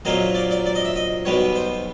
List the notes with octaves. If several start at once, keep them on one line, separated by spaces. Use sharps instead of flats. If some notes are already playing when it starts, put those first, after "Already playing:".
A#1 A#2 F#3 A#3 D#5
D5
D5
D5
D#5
E5
D#5
B1 B2 G3 B3 C#5
C5